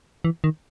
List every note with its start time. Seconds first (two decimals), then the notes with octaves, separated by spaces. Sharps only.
0.25 E3
0.44 D#3